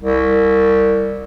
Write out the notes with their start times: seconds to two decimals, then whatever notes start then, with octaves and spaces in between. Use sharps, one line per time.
0.01 C2